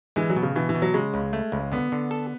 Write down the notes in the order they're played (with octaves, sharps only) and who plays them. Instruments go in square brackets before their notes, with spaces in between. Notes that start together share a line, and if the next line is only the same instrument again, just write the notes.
[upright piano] E3 [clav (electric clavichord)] G#3
[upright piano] F#3
[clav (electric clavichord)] B2
[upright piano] C#3
[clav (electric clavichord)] B2 [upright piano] E3
[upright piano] E3
[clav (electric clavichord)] B2
[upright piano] F#3
[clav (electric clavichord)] C#3 [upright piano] G#3
[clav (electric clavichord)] C#2
A3
C#2
[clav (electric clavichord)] D3 [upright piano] B3
[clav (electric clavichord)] D3
A4